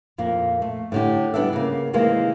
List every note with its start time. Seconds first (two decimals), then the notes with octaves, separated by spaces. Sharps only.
0.18 F2 A#2 A#3
0.62 A3
0.92 A2 D3 G4
1.34 G3 B3 D4 G4 A4 E5
1.53 C#3 A#3
1.93 C3 D#3 E3 G#3 A#3 C4